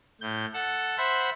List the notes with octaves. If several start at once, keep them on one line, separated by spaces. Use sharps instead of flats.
A2 G6
A4 F#5
C5 E5 F#5 B5